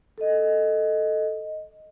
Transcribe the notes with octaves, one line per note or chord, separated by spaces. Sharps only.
A4 D#5